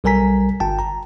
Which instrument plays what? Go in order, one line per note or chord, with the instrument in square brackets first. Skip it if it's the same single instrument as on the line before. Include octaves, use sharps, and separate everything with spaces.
[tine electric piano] B1 G3 A#4 G#5 A#5 B6
G1 G5 A5
A#5